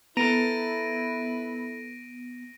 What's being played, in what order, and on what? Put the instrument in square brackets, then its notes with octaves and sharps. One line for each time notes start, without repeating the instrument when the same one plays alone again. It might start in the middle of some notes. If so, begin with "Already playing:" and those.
[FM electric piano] B3 [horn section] E4 B4 [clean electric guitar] A4 A#5 [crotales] A#6 D7 D#7